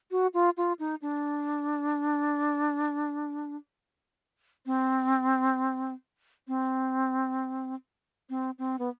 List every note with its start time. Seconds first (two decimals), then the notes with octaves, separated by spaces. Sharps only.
0.11 F#4
0.34 F4
0.57 F4
0.79 D#4
1.02 D4
4.66 C4
6.48 C4
8.30 C4
8.59 C4
8.79 B3